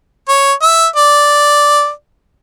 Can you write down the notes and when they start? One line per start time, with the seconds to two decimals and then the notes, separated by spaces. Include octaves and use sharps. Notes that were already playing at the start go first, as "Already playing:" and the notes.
0.29 C#5
0.62 E5
0.96 D5